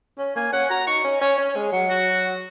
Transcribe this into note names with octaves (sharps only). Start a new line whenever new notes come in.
C#4
A#3 G#5
C#4 F#5
F#4 A#5
D#4 C#6
C#4
C#4 C#5
C#4
G#3
F#3
F#4